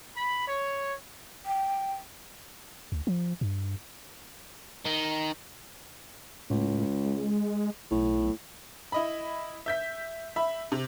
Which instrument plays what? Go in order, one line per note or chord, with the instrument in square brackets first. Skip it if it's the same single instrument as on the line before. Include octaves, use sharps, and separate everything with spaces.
[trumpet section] B5
C#5
[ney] G5
[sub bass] D2
F3
G2
[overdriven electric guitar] D#3
[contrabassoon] C#2 [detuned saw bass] A2
[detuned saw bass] G#3
[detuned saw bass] B1 [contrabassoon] A2
[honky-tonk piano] E4 D#5 B5
E5 G6 B6
E5 B5
C3